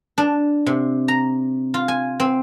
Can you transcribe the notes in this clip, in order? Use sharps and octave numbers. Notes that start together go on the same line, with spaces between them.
D4
C3
A#5
F4
G#5
C4